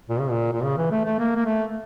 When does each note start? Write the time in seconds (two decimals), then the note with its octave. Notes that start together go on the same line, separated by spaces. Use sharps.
0.09 A#2
0.19 C#3
0.30 A#2
0.52 A#2
0.63 C#3
0.77 E3
0.91 A3
1.05 A3
1.19 A#3
1.36 A#3
1.45 A3